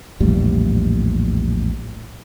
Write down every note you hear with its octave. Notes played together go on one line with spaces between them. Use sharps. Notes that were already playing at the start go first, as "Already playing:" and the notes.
A#1 E2 A2 G3